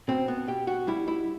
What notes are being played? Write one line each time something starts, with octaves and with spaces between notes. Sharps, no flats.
B2 C4
B3
B2 G4
F#4
G3 E4
E4